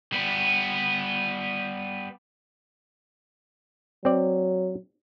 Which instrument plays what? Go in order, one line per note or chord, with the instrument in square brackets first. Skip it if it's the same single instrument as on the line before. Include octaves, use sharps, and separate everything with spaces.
[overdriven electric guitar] G3 B3
[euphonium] F#3 [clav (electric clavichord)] C4 D5